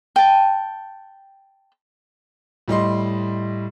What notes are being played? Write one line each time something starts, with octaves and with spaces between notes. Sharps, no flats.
G5 A5
A2 G3 D#5 C6